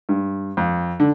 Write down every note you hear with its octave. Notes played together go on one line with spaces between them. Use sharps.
G2
F2
D3